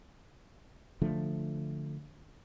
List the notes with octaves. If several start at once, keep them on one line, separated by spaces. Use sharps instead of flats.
D3 F3 A3